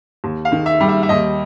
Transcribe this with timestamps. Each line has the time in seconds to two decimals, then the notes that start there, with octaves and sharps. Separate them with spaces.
0.24 D#2
0.45 F5
0.52 D#3
0.66 E5
0.80 G3
0.89 E5
1.03 E5
1.09 D#2 D#5